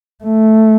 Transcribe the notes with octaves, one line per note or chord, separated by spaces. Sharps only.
A3